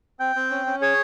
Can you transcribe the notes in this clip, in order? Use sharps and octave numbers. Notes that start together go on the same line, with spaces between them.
C4 G5
C4
C#4
C#4
G#4 C#5